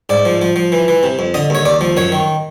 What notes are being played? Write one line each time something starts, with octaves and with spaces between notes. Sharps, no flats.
G#2 D5
F3
F3
F3
E3
E3
C3
F2
D3 D#5
D#2 C#5
D#2 D5
F3
F#2 C#5
D#3